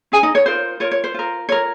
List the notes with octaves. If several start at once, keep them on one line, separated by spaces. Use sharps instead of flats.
C#4 G#4 G#5
D#4 D#5
C#5
F4 A#4 C5
F4 A#4 C#5
C#5
C5
F4 A#4
F4 A#4 C#5